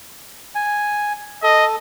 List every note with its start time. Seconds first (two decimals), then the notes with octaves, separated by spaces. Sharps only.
0.55 G#5
1.43 A4 D#5